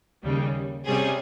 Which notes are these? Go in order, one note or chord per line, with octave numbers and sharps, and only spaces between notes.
D#2 C#3 G3
C3 G3 C#4 G#4